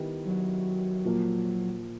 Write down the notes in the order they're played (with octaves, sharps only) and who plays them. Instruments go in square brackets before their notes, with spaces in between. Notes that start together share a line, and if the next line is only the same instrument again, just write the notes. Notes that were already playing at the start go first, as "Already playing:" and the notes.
Already playing: [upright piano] D#3 G3 B3 E4
[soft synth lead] F#3
[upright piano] A#2 F3 A#3